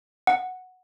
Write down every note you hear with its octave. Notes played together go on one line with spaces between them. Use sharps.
F#5